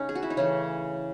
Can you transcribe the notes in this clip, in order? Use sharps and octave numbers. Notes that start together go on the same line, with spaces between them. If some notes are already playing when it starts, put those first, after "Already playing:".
Already playing: C#3 A3 C#4 D#4
G#4
F#4
E4
D#4
C#3 E3 A3 C#4